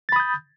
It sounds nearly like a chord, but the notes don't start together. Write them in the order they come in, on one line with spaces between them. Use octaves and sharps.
A6 B5 D#6 G6